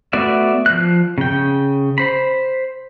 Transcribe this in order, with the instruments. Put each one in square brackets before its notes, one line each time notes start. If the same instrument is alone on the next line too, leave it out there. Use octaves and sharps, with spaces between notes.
[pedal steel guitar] A3 B3 F#4 D5 E5
F3 F#6
C#3 G5
C5 B5